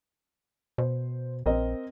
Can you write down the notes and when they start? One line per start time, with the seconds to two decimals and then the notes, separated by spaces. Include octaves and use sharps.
0.78 B2 C5
1.46 A#1 C4 A#4 D#5